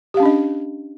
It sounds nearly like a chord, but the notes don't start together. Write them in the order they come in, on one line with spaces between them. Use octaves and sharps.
G4 F5 C#4 D4 D#5